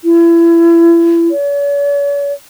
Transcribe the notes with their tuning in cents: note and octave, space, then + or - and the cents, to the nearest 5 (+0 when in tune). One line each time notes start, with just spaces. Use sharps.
E4 +35
C#5 +45